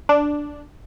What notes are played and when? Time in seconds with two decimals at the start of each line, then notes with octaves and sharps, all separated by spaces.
0.09 D4